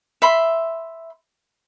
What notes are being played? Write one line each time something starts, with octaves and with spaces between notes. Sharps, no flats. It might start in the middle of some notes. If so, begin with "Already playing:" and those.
E5 B5 C6